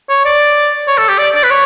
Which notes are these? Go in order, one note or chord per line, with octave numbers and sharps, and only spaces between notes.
C#5
D5
C#5
A4
G4
D5
D5
B4
C#5